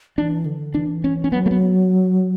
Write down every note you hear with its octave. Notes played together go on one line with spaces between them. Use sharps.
E3 D4
D3
E3 D4
C#4
C#4
F#3 B3
A3
B3